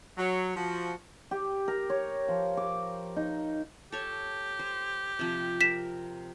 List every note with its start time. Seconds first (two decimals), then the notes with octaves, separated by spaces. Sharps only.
0.18 F#3
0.56 F3 F#4
1.31 G4
1.68 A#4
1.90 C#5
2.28 F3
2.57 D6
3.16 D#4
3.92 G4 A4 C#5
4.59 C5
5.19 C3 F3
5.61 A#4 B6 E7